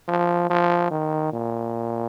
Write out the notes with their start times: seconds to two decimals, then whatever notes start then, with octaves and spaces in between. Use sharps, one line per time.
0.08 F3
0.50 F3
0.91 D#3
1.33 A#2